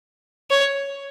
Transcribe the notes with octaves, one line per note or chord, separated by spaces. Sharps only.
C#5